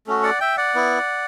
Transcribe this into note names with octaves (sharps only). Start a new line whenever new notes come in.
A3 C#4 F#4
D5 F#5
E5 G5
D5 F#5
B3 E4